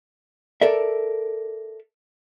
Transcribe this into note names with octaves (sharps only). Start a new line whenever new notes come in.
A4 A#4 D5 E5